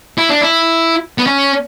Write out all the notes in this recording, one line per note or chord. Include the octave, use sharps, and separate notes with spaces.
E4
D4
E4
B3
C#4